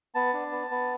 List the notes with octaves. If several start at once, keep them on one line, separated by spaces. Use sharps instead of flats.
B3 A5
D4
B3
B3